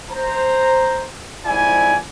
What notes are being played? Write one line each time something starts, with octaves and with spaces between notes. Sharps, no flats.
C5 A#5
F2 G#2 E4 D5 G#5